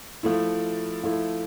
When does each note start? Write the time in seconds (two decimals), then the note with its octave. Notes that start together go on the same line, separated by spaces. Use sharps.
0.23 F3 A3 E4
1.03 F3 A3 E4